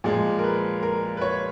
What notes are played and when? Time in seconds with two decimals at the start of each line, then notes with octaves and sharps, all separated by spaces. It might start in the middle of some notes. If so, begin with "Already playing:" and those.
0.04 A#2 F3 G#3
0.39 A#4
0.44 B4
0.83 A#4
1.17 B4
1.21 C#5